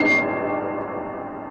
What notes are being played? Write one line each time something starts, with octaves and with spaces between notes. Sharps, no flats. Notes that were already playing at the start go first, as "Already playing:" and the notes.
Already playing: C7